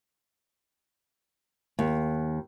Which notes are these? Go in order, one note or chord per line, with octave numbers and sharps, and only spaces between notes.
D#2